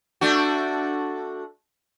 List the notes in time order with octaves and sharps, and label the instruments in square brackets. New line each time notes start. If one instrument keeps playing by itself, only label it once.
[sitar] A3 D4 F#4